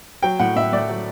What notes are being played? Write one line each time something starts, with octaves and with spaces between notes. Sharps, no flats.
F#3 G5
A2 F#5
A2 E5
A3 D5
F#3